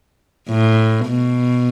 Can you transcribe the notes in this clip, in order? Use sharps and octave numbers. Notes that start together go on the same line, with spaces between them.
A2
B2